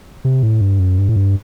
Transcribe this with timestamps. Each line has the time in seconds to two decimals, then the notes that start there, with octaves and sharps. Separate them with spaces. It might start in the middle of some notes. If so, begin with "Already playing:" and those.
0.25 C3
0.43 A2
0.61 G2
0.79 F#2
0.98 G2
1.09 A2
1.16 G2